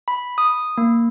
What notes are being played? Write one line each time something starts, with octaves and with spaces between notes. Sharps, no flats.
B5
D#6
A#3